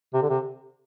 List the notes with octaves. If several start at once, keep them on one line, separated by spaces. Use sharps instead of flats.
C3
D3
C3